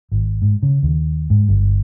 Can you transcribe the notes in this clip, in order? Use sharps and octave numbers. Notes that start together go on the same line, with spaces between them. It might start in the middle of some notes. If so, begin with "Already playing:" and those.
G#1
G#2
C#3
D#2
G#2
G1